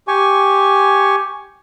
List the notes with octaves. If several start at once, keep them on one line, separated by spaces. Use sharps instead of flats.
G4 G#5 C#6